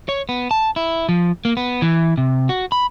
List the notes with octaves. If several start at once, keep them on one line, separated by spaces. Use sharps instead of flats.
C#5
B3
A5
E4
F3
A#3
B3
E3
C3
F#4
B5